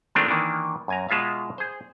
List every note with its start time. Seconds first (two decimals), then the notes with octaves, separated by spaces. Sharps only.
0.15 D#3 G#3 A3 C4 D4 F4
0.28 D#3 E3 A#3 D4
0.88 F#2 G#5 A#5
1.09 B2 G#3 F4 E5 F5
1.58 G#4 C5